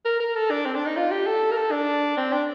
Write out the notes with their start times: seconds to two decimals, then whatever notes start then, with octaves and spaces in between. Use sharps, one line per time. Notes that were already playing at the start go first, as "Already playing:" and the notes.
0.05 A#4
0.20 A#4
0.35 A4
0.51 D4
0.66 C4
0.76 D4
0.86 D#4
0.96 F4
1.11 G4
1.27 A4
1.51 A#4
1.57 A4
1.71 D4
2.17 C4
2.32 D4